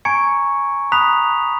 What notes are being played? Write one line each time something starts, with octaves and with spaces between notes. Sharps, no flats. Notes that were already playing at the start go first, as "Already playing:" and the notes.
G#5 A#5 C#6 G#6 C#7 D7
A#5 B5 D#6 F#6 B6 F7